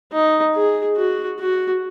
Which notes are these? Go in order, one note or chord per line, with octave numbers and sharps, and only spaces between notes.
D#4
G#4
F#4
F#4